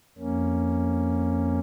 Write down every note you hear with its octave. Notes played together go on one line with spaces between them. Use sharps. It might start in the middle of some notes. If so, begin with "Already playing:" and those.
F2 A#3 C#4